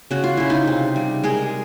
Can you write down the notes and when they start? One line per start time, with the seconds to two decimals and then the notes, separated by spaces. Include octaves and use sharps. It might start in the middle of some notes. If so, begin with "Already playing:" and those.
0.11 C#3 F#4
0.24 F4
0.37 C#3 E4
0.50 D#4 F4
0.67 C3
0.96 G3
1.24 G#3 G#4 A#4